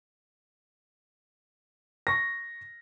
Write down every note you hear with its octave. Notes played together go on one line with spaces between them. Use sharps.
C#6 A#6